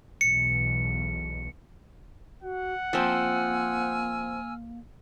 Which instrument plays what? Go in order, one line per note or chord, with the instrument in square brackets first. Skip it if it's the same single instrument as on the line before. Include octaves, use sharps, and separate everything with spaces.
[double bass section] B1 E2 B2 [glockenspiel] C#7
[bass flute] F#4 [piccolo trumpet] F#5
[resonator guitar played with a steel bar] F3 C4 [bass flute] A#3 [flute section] G#5 E6 F6